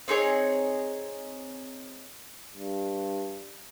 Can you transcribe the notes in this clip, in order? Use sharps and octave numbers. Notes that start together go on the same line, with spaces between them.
C4 D#4 G#4 C#5
G2